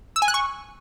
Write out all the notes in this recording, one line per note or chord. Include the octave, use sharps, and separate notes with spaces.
E6
G#5
F#6
C#6